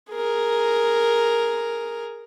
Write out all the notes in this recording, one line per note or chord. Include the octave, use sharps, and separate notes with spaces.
G#4 A#4